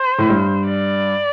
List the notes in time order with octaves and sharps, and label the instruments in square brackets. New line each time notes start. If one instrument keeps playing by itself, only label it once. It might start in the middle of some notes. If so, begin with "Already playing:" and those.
Already playing: [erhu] C5
[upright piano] A2
G2
[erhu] D5